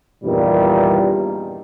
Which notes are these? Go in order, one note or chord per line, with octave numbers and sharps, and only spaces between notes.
E2 G2 A#2 D#3 G3